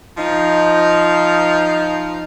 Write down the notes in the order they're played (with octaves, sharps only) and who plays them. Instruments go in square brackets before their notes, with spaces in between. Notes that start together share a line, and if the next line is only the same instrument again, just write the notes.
[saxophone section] F3 D#4